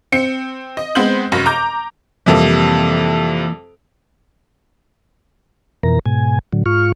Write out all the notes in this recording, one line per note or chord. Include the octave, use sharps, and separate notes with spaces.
C4 C#7
D#5
G#3 B3 C4 C5 G6 F#7
F1 F#2 A#6
A#5 D6 G6
F2 C3 E3 G3 A#3
F2 B2 E3 A#4 A#5
G#2 B2 G#5
A2 D3 F#3
G#2 F4 C#6 F6